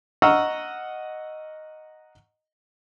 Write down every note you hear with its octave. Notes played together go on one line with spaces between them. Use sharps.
D#5 F#5 A#5 C#6 E6 F6